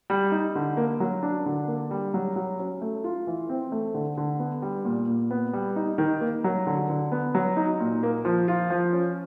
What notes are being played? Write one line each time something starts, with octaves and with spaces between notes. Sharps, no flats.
G3
D#4
D3
A#3
F#3
D4
D3
A#3
G3
F#3
F#3
C#4
A3
F4
E3
C4
A3
D3
D3
B3
G3
A#2
A#2
B3
G3
D#4
D#3
A#3
F#3
D3
D3
B3
F#3
D#4
A#2
A#3
F3
F4
F3
C#4